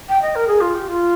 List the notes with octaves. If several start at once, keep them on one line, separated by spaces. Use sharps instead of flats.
G5
D#5
A#4
G#4
F4
G4
F4